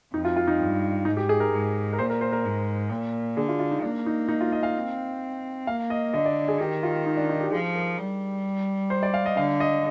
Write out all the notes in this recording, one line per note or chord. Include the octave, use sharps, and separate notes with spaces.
F2 D#4
F4
F4
D#4
G2
G#2 D#4
G4
G#4
A#4
G#2
A#4
A#2 C5
A#4
C5
A#4
G#2
A#2
D3 G#4
F4
F4
D#4
A#3 D4
D#4
D#4
F4
D#5
F5
C4
A#3 F5
D#5
D3 D#5
D5
G#4
D#3 G4
F4
D#4
D4
D#4
G4
F3 G#4
A#4
G3
C5
D5
F5
D#5
D3 F5
D#5